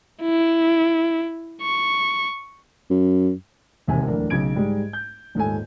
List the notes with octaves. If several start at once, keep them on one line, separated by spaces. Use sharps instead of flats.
E4
C#6
F#2
E1 D#2 C3 G#5
D1 E2 A2 D4 A#4
B1 C#3 G#6 D7
G#2 G3 G#3
G6
D#1 G#2 A4 G#5